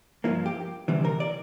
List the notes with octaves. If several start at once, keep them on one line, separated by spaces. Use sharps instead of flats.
G2 F3 A#3 E4
G4
D2 C3 E3 G3
A#4
D5